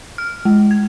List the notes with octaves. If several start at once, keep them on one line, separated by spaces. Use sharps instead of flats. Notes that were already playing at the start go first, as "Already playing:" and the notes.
F6
G#3
G#6